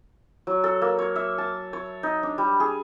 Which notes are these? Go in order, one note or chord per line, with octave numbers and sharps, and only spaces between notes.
F#3
A4
A#3
C#5
E5
A5
C#5
D#4
D4
G3
G#4